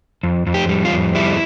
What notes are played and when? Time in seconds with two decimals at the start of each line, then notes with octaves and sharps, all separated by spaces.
0.23 F2
0.47 F2
0.54 G4
0.69 G3
0.85 F4
0.92 F2
1.15 G3 E4